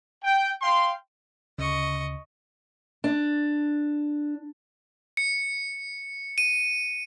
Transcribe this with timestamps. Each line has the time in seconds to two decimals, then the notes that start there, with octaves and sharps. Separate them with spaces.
0.24 G5
0.62 F5 G5 C6
1.58 D2 C#3 D#5 C#6
3.04 D4
5.17 C#7
6.38 D#7